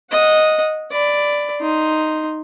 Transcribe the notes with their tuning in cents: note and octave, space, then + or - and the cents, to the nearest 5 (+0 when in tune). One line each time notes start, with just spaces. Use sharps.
D#5 +0 F#5 -20
D5 +0 B5 +20
D#4 +0 C6 +0